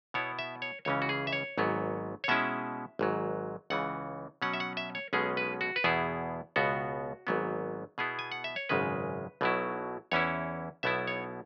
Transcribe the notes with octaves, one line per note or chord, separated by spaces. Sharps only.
B2 B3 E4 C#5
E5
C#5
C#2 C#3 E3 C#4 C#5
F#4
G#4
E5
C#5
G#1 G#2 F#3 B3
C#5
B2 G#3 C#4 E4 E5
G#1 G#2 F#3
C#2 C#3 E3 F#5
B2 F#3 C#4 F#5
E5
F#5
E5
C#5
B1 B2 G#3 C#4 G#4
B4
F#4
B4
E2 B2 B3 E4 G#4
C#2 B2 B3 F#4
G#1 G#2 F#3 B3
B2 B3 E4 G#4
G#5
F#5
E5
C#5
G#1 F#2 C#3 G#3 B4
B1 B2 F#3 E4
E2 E3 C#4 E4 C#5
B1 B2 B3 E4 E5
C#5